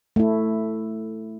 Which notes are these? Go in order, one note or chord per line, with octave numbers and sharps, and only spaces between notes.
A3 E4